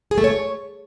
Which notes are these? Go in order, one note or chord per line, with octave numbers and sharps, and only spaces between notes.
G#4
A3
C#5